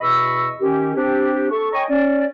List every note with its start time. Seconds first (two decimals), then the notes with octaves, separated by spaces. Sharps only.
0.01 E2 B2 D#5 B5 C#6 E6
0.61 D#3 C#4 G4
0.96 C4 D4 G4
1.51 A4 C#6
1.73 C#5 D#5 G5 G#5 A#5 C#6
1.90 C#4 D5